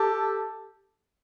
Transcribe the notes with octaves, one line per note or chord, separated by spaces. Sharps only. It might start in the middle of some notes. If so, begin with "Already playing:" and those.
Already playing: G4 A4